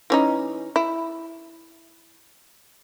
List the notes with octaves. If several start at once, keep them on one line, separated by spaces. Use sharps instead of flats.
E3 C#4 D#4
E4